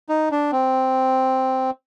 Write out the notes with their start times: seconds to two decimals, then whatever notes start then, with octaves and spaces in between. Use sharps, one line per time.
0.09 D#4
0.31 D4
0.52 C4